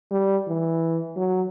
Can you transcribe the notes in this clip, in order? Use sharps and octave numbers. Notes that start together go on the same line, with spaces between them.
G3
E3
F#3